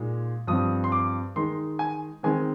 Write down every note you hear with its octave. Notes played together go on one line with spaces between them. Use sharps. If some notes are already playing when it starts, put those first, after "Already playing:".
Already playing: A#2 G#3 D#4
G2 F3 C4 D#6
C6
D6
D#3 G#3 D#4 C6
G#5
D#3 G#3 C4 G#5